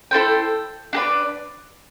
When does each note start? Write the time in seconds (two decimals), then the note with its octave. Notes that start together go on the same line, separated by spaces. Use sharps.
0.11 E4 A4 C5 G5
0.93 D4 G4 B4 D5